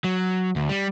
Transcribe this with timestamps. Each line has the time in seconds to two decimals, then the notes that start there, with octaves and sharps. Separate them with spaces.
0.04 F#3
0.56 D2
0.69 G3